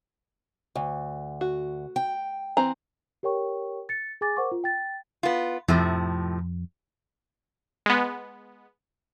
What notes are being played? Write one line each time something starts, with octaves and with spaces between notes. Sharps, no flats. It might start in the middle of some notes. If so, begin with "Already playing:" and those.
D2
F#4
G5
E3 C4 A#5
G4 A#4 C#5 G5 C#6
A6 C#7
G#4 G#5 D6 A6
A#4 C5 F#5 C#6 D6
F4
G5 A6
B3 F4
F2 A2 C3 F3
G#3 B3